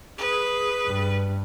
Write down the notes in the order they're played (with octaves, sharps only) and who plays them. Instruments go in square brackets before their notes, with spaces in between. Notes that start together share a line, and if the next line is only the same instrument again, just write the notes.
[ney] G#4 [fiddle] B4
[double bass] G2